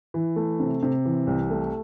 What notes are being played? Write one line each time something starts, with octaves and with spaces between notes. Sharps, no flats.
E3
A3
C3
C3
E3
C2
A3